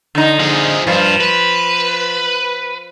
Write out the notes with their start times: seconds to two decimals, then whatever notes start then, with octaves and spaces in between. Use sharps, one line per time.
0.15 D3 D#4
0.40 F3 G#4
0.87 G2 F3
1.20 B4